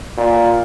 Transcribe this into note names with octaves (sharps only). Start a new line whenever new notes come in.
A#2